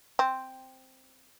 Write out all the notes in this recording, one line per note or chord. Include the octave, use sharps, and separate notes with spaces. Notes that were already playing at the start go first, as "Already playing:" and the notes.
C4